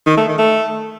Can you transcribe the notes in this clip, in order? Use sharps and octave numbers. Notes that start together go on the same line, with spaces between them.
D#3
A3
D#3
A3